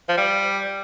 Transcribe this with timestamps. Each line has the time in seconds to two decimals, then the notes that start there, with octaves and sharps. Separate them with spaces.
0.09 F3
0.17 G3